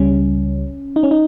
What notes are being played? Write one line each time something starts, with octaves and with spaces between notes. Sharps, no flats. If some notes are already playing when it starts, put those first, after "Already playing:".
Already playing: C#2 C#3 G3 C#4
D#4
C#4
D#4